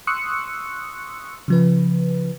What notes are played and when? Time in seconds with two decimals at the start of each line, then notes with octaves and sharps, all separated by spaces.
0.07 C6 C#6 D#6 E6 F#6 C#7
1.48 C#3 F3 B4